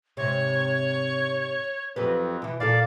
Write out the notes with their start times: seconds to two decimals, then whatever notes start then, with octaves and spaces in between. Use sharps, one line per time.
0.17 G#2 C3 C#5
1.96 F2 F#3 G4 B4
2.42 B2 E3
2.60 A#2 D4 A4 D5 F5